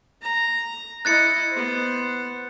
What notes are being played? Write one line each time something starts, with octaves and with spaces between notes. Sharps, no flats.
A#5
E4 D#5 F#6 A6 C#7
B3 C5